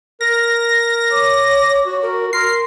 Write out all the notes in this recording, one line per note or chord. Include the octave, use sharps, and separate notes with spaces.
A#4 A#6
C#5 D6
F#4 C#6
A#4
A#4 C6 C7